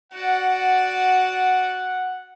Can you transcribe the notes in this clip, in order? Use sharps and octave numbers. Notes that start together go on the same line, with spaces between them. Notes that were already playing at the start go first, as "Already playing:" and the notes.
F#4 D5 F#5